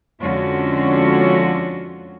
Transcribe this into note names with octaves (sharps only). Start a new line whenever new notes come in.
F2 D3 G#3 C#4 F4 F#4